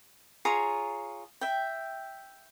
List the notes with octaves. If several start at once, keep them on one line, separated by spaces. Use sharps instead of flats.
F4 G#4 C#5 A#5
E5 G5